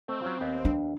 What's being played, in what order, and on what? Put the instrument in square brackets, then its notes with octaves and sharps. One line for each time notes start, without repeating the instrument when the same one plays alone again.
[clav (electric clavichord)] A3 D#5 [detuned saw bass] C4
[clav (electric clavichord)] F#3 C#4 F4
D#2 B3 G4
[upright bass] D4